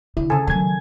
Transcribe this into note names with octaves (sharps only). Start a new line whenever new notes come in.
D3 E4
C#3 A4 G#5
D#3 F#3 G#5 G#6